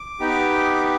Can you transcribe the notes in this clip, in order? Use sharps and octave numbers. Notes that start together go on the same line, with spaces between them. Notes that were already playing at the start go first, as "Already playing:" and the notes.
Already playing: D6
B3 D#4 G4